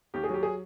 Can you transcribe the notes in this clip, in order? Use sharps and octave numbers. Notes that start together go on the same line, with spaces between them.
D#2 G4
G#4
F#3 G4
G#4